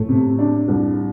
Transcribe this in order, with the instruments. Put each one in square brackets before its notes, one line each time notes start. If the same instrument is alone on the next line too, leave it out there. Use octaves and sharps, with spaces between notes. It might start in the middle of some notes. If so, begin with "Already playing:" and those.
Already playing: [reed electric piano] A2 [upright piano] A3
[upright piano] C3
D4
C2